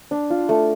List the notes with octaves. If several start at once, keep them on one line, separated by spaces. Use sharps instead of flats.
D4
F4
A3